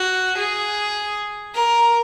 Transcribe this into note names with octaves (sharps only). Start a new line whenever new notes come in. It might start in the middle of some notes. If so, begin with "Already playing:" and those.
Already playing: F#4
G#4
A#4